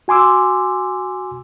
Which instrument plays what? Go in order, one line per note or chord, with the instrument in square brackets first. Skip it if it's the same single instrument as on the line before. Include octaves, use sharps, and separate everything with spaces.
[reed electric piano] F#4 G#5 C6 D6 E6